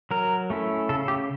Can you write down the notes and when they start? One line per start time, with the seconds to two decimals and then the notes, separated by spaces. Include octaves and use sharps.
0.11 F#3 A#4
0.50 A3 C#4 E4
0.89 C#3 A4
1.08 G4